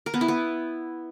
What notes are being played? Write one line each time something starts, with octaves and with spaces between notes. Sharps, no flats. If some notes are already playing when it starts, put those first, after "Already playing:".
A#4
B3
E4
B3